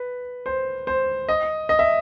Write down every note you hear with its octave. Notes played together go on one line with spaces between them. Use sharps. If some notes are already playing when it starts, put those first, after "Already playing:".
Already playing: B4
C5
C5
D#5
D#5
E5